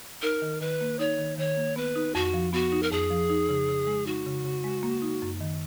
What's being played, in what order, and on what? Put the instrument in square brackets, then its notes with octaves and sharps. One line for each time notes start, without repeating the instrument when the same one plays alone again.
[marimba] D#4 [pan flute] A#4
[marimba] D#3
[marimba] D#3 [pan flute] B4
[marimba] A#3
[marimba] D#4 [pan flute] C#5
[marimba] D#3
[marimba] D#3 [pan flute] C#5
[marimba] A#3
[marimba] B3 [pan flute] B4
[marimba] D#4
[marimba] F2 [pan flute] F#4
[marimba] F3
[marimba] B3 [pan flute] F#4
[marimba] D#4
[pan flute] A#4
[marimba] F2 [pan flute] G#4
[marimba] F3
D#4
C#3
C#3
G#3
[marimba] D#4 [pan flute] F#4
[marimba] C#3
C#3
G#3
A#3
D#4
F#2
D#3